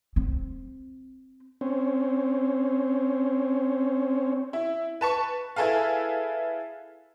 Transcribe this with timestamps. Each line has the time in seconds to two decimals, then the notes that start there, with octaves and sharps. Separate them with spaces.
0.16 C4
1.61 C4 C#4
4.53 E4
5.01 B4 A5 C#6
5.56 E4 G#4 A4 B4 F5